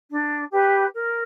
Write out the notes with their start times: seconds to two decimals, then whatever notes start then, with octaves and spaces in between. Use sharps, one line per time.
0.11 D4
0.52 G4 B4
0.94 A#4